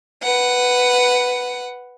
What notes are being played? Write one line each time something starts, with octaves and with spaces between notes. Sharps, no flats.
B4 F#5